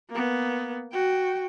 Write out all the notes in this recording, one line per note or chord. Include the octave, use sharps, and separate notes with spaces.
A#3 B3
F#4 G5